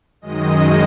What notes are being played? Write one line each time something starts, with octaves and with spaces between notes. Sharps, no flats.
F#2 D#3 G#3 D#5